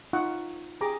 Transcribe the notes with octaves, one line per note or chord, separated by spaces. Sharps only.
D#4 F4 F#5 C#6
G4 G#4 A#5 D6